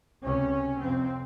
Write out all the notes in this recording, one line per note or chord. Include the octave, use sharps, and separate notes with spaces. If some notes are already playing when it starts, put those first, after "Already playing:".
C#2 C3 C#4
F2 C3 C4